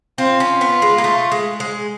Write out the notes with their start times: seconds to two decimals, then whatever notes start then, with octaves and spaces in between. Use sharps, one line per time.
0.18 C4 F4
0.40 C#4
0.61 B3
0.82 G#3
0.98 A#3
1.04 A3
1.32 G#3
1.60 G#3